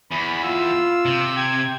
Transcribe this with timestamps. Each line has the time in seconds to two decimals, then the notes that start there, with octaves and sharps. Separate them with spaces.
0.11 E2 B5
0.44 F4 E6
1.05 C3
1.37 G5 G#6